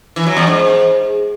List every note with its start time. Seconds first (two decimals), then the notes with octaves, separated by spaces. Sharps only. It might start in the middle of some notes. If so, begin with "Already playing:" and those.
0.16 E3
0.26 F#3
0.37 E2
0.47 G#2